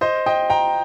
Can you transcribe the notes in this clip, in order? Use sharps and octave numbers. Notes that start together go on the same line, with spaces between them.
C5 D#5
D#5 G5
G5 A#5